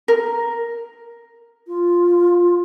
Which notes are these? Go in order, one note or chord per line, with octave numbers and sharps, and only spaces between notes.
A#4
F4